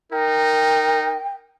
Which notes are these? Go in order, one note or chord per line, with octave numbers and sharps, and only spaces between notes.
D#4 A#4 G5